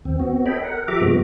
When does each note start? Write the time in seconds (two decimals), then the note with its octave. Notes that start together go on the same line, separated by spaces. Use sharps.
0.05 D#2 C4
0.19 B3 C4 F#4
0.46 A4 C#5 D#5 G5 B5
0.63 A#4 F#5
0.88 F3 G4 A4 E5 A#5 D6
1.01 G2 C3 F3 G#3 B3 F#4